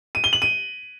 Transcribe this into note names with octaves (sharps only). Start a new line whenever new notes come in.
D#7
G7
F#7
D#7